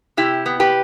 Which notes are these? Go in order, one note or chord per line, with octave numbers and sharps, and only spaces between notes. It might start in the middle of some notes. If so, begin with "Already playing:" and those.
C3 E4 G4
B3
G4 B4